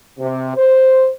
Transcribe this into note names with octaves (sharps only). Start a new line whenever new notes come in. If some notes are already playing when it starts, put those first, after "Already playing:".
C3
C5